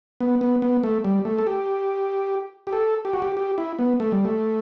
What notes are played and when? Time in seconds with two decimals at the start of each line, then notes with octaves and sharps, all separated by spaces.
0.21 B3
0.41 B3
0.62 B3
0.83 A3
1.04 G3
1.25 A3
1.38 A4
1.47 G4
2.67 G4
2.73 A4
3.05 G4
3.13 F#4
3.22 G4
3.37 G4
3.58 E4
3.79 B3
4.00 A3
4.12 G3
4.25 A3